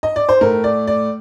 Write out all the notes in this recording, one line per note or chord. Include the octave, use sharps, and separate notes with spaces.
D#5
D5
C5
A2 A3 A#4
D5
D5